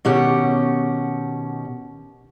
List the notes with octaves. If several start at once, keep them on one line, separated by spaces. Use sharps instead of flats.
B2 D#3 C#4 G4 F#5